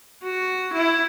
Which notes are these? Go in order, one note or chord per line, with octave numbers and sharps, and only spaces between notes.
F#4
E4